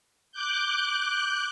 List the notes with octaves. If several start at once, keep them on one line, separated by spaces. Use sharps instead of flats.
D6 F#6 G6